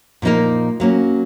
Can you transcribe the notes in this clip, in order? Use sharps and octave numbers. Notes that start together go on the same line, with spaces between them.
A#2 F3 A#3 D#4 A#4
F#3 A#3 C#4